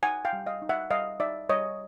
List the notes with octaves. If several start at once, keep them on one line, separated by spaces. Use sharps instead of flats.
D#4 F#5 G#5
F5 G5
G3
D#5 F5
D#4
E5 F#5
G3 D#5 F5
D#4 D5 E5
G3 C#5 D#5